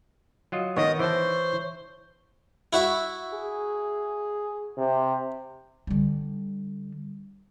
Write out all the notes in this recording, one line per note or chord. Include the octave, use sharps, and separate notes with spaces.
F#3 F4 D#5
D#3 B3 C#5 D#5
E3 C5 A5
E4 F#4 E5
G#4
C3
D3 G3